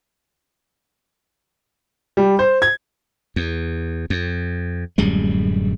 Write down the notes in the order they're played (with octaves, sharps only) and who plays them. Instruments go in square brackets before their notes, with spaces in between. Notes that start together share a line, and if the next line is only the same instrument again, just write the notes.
[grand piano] G3
C5
G#6
[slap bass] E2
F2
D1 F#2 G3 G#3